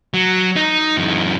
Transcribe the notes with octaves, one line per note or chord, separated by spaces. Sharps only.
F#3
D#4
F#2 E3